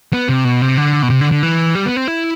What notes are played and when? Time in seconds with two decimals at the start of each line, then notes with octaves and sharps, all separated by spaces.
0.13 B3
0.29 C3
0.45 B2
0.62 C3
0.78 D3
1.03 B2
1.10 C3
1.21 D3
1.31 D3
1.43 E3
1.75 G3
1.86 B3
1.96 C4
2.08 E4